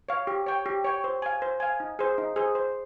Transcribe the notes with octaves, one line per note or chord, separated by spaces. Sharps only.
C#5 F5
G4
C#5 G5
G4
C#5 G5
C5
F5 G#5
C5
F5 G#5
D#4
G#4 C5
D#4
G#4 C5
C5